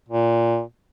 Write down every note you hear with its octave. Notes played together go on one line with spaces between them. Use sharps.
A#2